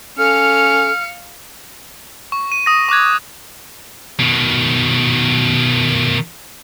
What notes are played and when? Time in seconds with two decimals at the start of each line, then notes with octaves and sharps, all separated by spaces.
0.18 C#4 A4 F5 F6 C#7
2.32 C#6
2.52 D#7
2.66 D#6 A#6
2.89 C#6 D6 F#6 G#6
4.20 B2 D#3